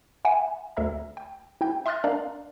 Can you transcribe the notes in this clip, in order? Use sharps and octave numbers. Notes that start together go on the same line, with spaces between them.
E5 F#5 G#5
D2 A4 E5 A#5
G5
E4 G5 G6
E5 C6 D#6 F6 F#6 A6
D4 A#4 D5 F5 A#5